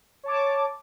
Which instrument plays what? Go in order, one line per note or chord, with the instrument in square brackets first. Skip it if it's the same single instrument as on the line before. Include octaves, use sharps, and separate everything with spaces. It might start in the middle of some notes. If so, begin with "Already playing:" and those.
[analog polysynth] C#5 A5 D6